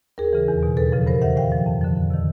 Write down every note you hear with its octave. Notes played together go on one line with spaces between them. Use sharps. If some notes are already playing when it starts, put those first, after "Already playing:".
D#2 G#4 A#4
C#3 E3
E2
B2
D#2 A4 B4
C#3 F3
G2 A#4 C5
D#3 E5 F#5
A2 F5 G5
F3
F2
D3 F3
F2
C3 D#3